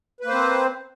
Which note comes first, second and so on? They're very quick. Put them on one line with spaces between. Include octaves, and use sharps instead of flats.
B4 A#3 C5 C4